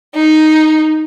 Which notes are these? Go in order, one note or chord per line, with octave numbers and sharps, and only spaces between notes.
D#4